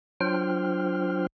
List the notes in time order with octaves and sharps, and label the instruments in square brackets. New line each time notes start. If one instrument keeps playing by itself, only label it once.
[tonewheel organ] F#3 D4 F4 C5 G5 F6